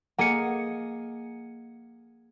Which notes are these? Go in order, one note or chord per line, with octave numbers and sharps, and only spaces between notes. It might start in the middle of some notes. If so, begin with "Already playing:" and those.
A#3 G#4 D#5 F#5 C#7